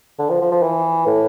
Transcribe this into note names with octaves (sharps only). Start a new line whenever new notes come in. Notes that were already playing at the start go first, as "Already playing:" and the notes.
D3
F3
F3
F3
E3
A2